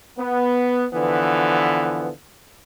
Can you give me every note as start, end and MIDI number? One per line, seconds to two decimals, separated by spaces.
0.18 0.85 59
0.94 2.10 50
0.94 2.10 52
0.94 2.10 53
0.94 2.10 59